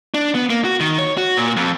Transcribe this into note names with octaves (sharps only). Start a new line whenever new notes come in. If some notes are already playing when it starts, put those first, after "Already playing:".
D4
B3
A#3
F#4
D#3
C#5
F#4
A#2
F2